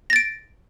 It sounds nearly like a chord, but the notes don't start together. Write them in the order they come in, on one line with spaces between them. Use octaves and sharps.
A#6 A6 D7